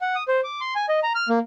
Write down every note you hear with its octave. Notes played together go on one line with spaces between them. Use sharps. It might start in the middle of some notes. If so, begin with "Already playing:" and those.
F#5
D#6
C5
D6
C6
G#5
D#5
A#5
F6
A#3